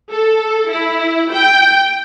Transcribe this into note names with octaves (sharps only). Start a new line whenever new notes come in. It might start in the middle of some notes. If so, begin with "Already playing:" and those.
A4
E4
G5